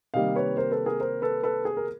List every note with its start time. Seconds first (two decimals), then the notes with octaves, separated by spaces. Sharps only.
0.14 C3 D#3 G3 A#3 D#5 F5
0.36 B4 C#5
0.57 A#4 C5
0.72 A4 B4
0.86 G#4 A#4
1.00 A#4 C5
1.22 A4 B4
1.44 A4 B4
1.65 G#4
1.77 A#4